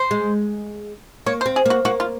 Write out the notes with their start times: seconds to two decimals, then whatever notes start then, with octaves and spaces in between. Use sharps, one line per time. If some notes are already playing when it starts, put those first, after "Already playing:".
Already playing: C5
0.11 G#3
1.26 A#3 C#5
1.41 C5
1.46 C4
1.56 G#4
1.66 A#3 F#4
1.85 A#3 F#4
2.00 F4